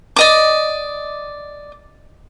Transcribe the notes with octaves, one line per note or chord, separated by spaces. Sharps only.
D5 D#5 D6